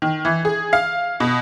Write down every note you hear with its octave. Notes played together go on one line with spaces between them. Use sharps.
D#3
E3
G#4
F5
B2